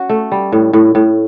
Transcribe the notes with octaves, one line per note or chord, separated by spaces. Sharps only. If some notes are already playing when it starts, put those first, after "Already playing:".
Already playing: C#4 F#4
A3
G3
A2
A2
A2